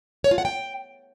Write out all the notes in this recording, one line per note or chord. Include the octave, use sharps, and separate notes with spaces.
C#5
F4
F#5
G5